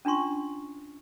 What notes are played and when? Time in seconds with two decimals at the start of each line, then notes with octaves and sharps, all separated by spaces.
0.05 C#4 D4 F4 C6 C#6